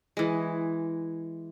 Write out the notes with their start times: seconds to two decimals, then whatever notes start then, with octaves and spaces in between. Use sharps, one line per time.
0.17 E3 G#3